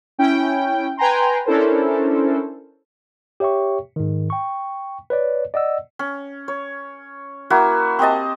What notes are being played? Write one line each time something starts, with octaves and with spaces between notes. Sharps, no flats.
C#4 E4 G5
B4 G5 G#5 A#5 C6
C#4 D4 E4 A4 A#4 C5
G4 C#5 E5 G5 C#6
G#2 D#3
G5 C#6
B4 C#5 D5
D5 D#5 F#5 E6
C#4
C#5
A#3 E4 F#4
C4 G4 D#5 A5